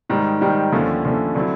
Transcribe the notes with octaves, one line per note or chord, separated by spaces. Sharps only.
G#2 D#3 G3
G#2 D#3 G3
D#2 D3 F3 A3 C#4
D#2 D3 F3 A3 C#4
D3 F#3 A3 C4 E4